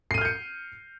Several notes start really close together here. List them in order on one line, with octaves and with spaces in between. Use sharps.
C7 D#7 F6 G6 C#7